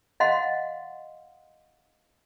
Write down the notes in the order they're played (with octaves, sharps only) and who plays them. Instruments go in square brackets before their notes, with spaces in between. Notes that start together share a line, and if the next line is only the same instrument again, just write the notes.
[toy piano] D#5 F5 F#5 C6